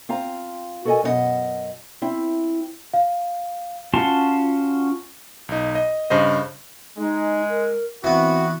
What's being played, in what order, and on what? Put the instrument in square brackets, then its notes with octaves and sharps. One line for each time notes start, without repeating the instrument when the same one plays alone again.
[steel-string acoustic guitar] C4 F4 F5 A#5
F#4 A4 A#4 D5 D#5 G#5
F#2 B2 D4 D#5 F#5
C4 E4
[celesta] F5
[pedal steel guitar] C#4 F4 F#4 A5 C6
[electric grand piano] B1 D#4
D#5
G2 C#3 C5 D#5
[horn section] G#3 [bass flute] D#4
[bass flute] A#4
[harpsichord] E3 B3 [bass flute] C4 [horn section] E4 F#4